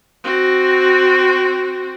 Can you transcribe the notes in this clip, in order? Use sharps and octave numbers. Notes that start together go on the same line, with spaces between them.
C4 F#4